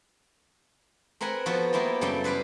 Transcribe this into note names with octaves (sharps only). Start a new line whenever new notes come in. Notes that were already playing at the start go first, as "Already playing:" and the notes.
C4 A#4 B4 F#5 G#5
F3 B3 F4 F#4 A4 B4
A#3 B3 E4 F4 G4
F#2 C#3 G3 A4 D5 G5
E4 B4 C5 D5 F5